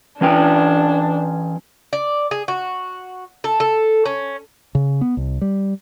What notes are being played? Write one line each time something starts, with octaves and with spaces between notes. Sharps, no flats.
E3 C#4 D4 G5
D5
G#4
F#4
A4
A4
C#4
C#3
B3
C2
G3